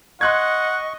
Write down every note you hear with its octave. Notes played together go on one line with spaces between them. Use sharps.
D#5 F#5 C6 C#6 F#6 G#6